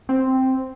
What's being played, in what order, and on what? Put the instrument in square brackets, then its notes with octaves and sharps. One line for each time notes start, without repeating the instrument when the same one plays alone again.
[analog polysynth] C4